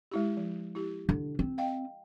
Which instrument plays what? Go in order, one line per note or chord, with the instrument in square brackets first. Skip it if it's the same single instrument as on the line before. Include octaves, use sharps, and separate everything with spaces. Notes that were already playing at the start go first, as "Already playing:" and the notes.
[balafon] G#3 E4 G4
F3
E4 G4
[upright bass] D3
C4
[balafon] D#5 F5 G5